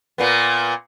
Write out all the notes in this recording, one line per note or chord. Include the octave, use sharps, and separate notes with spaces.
A#2 A#3 B3